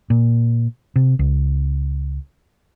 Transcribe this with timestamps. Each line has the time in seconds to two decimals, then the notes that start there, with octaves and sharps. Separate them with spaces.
0.10 A#2
0.96 C3
1.19 C#2